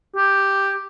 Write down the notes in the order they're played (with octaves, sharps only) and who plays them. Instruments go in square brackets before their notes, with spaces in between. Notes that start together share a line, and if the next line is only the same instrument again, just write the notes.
[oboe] G4